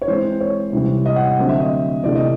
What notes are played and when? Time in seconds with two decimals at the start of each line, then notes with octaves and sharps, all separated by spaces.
0.02 C#5
0.07 E3 G#3 C4 C5
0.32 C5
0.40 C#5
0.73 C3 E3 G3 C4
1.06 D#5
1.16 F#5
1.27 F#5
1.39 D3 F#3 A3 C4
1.49 E5
1.60 D#5
2.04 C3 E3 A3 D5
2.15 D#5